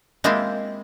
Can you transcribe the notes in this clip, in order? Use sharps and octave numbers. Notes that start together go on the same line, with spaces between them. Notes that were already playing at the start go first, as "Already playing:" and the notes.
G#3 A#3 C4 E4 F4 G4